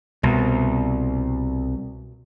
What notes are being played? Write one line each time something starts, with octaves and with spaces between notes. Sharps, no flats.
C2 B2